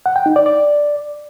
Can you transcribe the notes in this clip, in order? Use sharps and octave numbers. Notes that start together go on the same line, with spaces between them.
F#5
G5
D#4
D5
D5